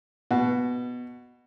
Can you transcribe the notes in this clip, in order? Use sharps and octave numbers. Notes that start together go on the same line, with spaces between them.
B2